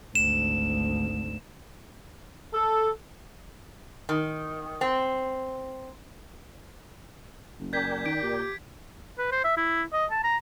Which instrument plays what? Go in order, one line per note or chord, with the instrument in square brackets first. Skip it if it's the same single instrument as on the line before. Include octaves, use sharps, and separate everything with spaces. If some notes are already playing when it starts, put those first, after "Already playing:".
[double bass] G#1 D2 [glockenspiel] E7
[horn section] A4
[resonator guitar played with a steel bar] D#3
C4
[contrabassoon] F#1
[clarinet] C#4 [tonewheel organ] A#4 D5 G5 [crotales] G6 G#6 B6
[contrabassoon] D#3 [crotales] D7
[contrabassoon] A#2 [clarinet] G4
[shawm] B4
C5
E5
E4
D#5
A5
A#5